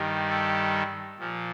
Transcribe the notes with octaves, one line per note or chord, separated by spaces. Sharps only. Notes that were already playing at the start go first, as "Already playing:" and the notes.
Already playing: G2 D#3 G3
A4
A#2 F3